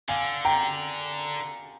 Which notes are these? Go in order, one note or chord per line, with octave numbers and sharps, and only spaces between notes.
D3 F5 G#5
G5 A#5